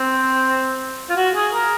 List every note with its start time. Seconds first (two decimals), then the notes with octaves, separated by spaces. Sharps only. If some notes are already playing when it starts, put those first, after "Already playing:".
Already playing: C4
1.09 F4
1.16 F#4
1.35 G#4
1.53 A#4